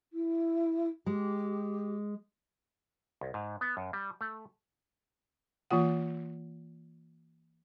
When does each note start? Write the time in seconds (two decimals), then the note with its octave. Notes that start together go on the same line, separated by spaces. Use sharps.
0.13 E4
1.06 G#3 G4
3.21 C2
3.34 G#2
3.61 B3
3.77 F#2
3.93 G3
4.21 A3
5.71 E3 A#3 F4 F#5